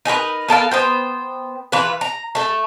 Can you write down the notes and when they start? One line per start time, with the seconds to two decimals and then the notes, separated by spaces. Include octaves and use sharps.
0.05 D#4 G#4 A#4 B4
0.48 B3 A4 A#4 F5
0.71 B3 C5 G5
1.72 E3 F4 B4
2.01 A#5
2.35 A3 A4